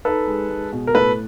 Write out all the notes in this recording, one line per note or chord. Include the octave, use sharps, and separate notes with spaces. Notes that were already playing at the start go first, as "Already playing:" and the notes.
D#4 A4 B4
G#3
G#3
B2
A#4
A2 A4 B4